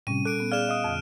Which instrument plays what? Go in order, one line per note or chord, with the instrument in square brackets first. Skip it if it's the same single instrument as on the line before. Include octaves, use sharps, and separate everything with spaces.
[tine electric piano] A2 C3 [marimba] G3 C#4 [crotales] D#7
[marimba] A#2 [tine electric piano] A4 [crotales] F#6 D7
[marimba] B3
[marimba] G#4 [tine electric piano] D5 F5 [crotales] F6 E7
[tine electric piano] D#5 F5 D#6
[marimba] F2 D3